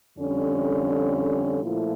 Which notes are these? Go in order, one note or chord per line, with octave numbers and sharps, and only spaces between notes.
F2 D3 G3 C#4
A#2 F3 A3 E4